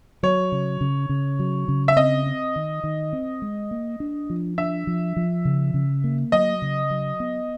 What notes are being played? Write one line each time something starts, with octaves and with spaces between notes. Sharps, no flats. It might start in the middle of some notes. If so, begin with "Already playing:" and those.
F#3 C#5
C#3
C#3
C#3
F#3
C#3
E5
C4 D#5
C4
D#3
D#3
C4
G#3
A#3
D4
F3
D4 E5
F3
F3
C#3
C#3
A#3
F#3 D#5
C#3
F#3
B3